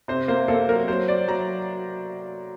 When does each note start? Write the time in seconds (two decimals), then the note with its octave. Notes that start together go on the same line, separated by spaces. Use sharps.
0.08 C3 C5
0.28 A#3 C5
0.48 A#3 A4
0.68 F#3 A#4
0.88 F#3 C5
1.08 F#3 D5
1.27 F#3 A#5